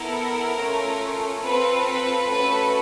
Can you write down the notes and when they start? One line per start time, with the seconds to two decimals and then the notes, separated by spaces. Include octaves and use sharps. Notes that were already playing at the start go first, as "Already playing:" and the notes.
Already playing: B3 E4 A4 A#4
0.58 A3 C#4 F4
1.43 C4 F4 A4 B4
1.86 B4
2.28 A3 C#4 F#4 A4 B4